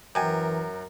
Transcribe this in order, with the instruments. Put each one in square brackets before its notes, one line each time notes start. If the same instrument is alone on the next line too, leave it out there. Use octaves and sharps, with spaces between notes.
[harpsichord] F#2 [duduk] E3 [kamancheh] A#4 [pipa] G5 G#5